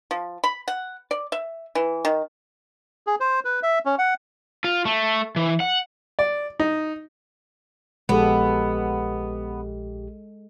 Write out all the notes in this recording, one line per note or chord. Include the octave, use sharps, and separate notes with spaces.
F3
B5
F#5
D5
E5
E3
D#3
G#4
C5
B4
E5
C#4
F#5
F4
A3
E3
F#5
D5
D#4
A#1 G#3 B3 G4 A4